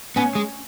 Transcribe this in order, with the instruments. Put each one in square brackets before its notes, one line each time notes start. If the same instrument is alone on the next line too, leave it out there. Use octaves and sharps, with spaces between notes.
[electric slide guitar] B3 [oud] C#4
[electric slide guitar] G#3